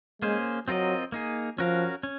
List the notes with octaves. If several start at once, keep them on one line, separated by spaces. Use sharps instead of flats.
G#3 A#3 C#4 G#4 C5
F#3 C4 F4 A#4 D#5
A#3 D#4 G#4
F3 C#4 F#4 A#4 F5
C#4